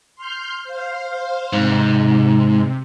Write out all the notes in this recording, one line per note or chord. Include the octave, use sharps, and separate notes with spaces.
C6 F6 G6
C5 F5
G#2 C3